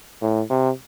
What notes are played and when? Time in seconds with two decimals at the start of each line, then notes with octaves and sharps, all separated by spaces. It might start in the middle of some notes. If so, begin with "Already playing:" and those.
0.21 A2
0.50 C3